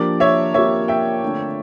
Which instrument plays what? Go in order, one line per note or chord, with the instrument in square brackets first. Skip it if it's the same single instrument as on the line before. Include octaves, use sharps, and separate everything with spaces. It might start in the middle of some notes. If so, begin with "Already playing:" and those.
Already playing: [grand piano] F3 A#3 D4 G4 [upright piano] A#4 D5
[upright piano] C#5 E5
[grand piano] F3 A#3 D4 G4 [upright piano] C#5 E5
[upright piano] E5 G5
[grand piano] D3 A3 D4 F4